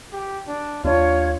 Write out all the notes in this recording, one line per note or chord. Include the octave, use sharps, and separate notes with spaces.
G4
D4
D#2 D4 F4 C#5